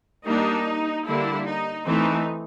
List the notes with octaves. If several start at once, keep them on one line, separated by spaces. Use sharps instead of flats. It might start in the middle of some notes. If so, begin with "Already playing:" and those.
G3 A#3 D4 D#4
D3 G3 A#3 D4 E4
D#4
E3 A3 C4 D#4